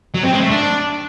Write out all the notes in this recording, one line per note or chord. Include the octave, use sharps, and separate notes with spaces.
F#3
C4
G#3
A3
D4